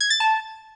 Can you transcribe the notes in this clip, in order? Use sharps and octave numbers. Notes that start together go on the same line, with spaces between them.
G#6
A6
A5